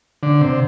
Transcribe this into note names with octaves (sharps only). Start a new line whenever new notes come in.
D3
C3